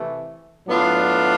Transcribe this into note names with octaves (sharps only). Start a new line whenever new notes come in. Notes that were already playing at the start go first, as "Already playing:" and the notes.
Already playing: C3 E3 A3
A2 F#3 B3 D4 F4